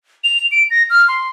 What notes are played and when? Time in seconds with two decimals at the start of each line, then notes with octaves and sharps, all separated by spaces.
0.24 F7
0.52 D7
0.71 A#6
0.90 F6
1.08 C6